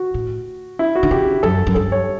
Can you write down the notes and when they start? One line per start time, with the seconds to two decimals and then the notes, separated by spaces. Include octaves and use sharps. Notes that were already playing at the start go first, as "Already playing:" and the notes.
Already playing: F#4
0.14 A2
0.79 E4
0.95 F#4
1.03 D3
1.11 C#3 G4
1.43 F#2 A4
1.67 F#2
1.75 G2 A4
1.92 C#5